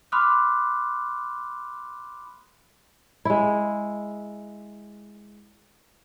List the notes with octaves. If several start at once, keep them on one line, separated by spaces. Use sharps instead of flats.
B5 C6 D6 D#6 F6 F#6
G#3 E4